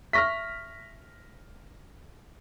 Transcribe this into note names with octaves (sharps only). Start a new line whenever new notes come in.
E5 C#6 F6 A#6 B6